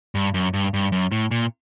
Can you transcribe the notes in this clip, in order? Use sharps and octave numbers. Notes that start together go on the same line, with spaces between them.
G2
F#2
G2
G2
F#2
A2
A#2